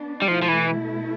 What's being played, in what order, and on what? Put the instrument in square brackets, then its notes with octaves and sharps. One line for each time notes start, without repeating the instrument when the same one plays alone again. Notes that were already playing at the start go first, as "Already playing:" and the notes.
Already playing: [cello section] B3 D4
[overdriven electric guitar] G3
[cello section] B2 A3 E4 [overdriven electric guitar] F3
[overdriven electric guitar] F3
E3